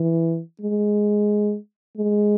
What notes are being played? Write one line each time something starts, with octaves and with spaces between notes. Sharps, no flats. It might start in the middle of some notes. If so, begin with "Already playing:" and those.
Already playing: E3
G#3
G#3